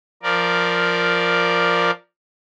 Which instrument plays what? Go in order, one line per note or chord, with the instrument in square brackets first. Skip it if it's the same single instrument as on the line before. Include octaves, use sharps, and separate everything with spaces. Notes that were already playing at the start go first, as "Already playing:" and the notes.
[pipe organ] F3 A#4 D5